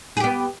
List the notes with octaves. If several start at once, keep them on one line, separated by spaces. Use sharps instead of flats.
B3 G4 G#4